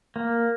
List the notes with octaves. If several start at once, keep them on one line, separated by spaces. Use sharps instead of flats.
A#3